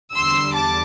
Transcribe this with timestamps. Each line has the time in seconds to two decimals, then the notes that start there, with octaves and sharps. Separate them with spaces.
0.13 E2 D3 G3 C6 E6
0.53 A5 D6